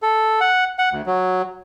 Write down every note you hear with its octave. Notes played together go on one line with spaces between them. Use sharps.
A4
F#5
F#5
D2
F#3